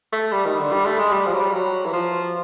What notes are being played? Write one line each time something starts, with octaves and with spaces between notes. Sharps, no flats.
A3
G3
D#3
D3
G3
A3
G#3
G3
F3
F#3
G3
F#3
E3
F3